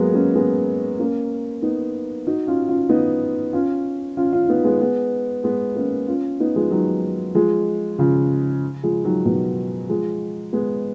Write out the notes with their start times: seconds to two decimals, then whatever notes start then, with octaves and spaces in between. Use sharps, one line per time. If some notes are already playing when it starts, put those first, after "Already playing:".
Already playing: F#3 G#3 A#3 B3
0.14 A#3 C#4
0.35 G#3 B3
0.99 A#3 C#4
1.62 B3 D#4
2.27 D#4 F#4
2.47 C#4 F4
2.69 C#4 F4
2.89 B3 D#4
3.53 C#4 F4
4.17 C#4 F4
4.33 C#4 F4
4.48 B3 D#4
4.64 G#3 B3
4.81 G#3 B3
5.44 G#3 B3
5.76 A#3 C#4
6.08 C#4 F4
6.40 B3 D#4
6.56 F3 G#3
6.71 D#3 F#3
7.35 F3 G#3
7.98 C#3 F3
8.83 F3 G#3
9.04 D#3 F#3
9.25 B2 D#3
9.89 F3 G#3
10.53 G#3 B3